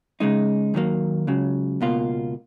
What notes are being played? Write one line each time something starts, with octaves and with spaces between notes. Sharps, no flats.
C#3 G#3 D#4
D#2 D#3 F#3 A#3
C#2 C#3 F#3
C#2 B2 A#3 F4